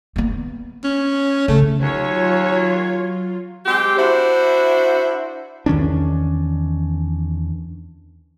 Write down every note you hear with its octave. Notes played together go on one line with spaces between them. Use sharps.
A#3 B3
C#4
C#3 A3
D#2 F#3 F4 C#5
G#3 C4 G4
D4 E4 F#4 C5
E2 D#3 C#4 D4